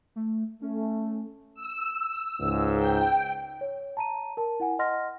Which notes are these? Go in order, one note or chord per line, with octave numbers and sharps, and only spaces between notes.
A3
A3 C#4
E6
C#2 G#2
G5
C#5
A5 A#5 D#7
A#4 A5
E4 F#5 G#5
D#5 F#5 C6 F6 A#6